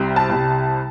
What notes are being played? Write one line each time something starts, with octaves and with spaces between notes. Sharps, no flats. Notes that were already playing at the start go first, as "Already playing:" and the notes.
Already playing: C2 C3 G3
A5
C2 C3 G3